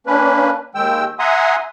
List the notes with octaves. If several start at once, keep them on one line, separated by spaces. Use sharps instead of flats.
A#3 C#4 D4 B4
D#2 D#3 G#3 G5 E6
E5 F#5 G#5 A#5 C6 D#6